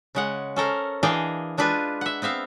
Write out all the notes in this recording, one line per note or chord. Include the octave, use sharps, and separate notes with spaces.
C#3 G#3 F#5
C#4 A4 A#4 C5
E3 D4 G#4 D#5 F5 G5
G#3 D4 F4 B4 G#5
E5 F#5
B3 C4 E5 F5